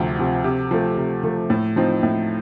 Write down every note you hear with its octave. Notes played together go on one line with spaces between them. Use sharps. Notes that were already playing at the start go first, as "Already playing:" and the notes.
Already playing: D2 C3 F3
C3 F3
C3
F3 A3
C3
F3 A3
A2
F3 C4 D#4
A2